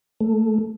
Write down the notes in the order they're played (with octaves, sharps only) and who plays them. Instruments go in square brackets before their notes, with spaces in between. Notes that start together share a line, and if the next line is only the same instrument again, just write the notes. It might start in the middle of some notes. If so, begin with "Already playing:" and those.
[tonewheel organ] A3